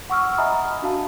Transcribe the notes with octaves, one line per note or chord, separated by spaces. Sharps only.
F#5 C#6 E6 F6
D#5 E5 G#5 A#5 B5 D#6
D4 F#4 F5 A5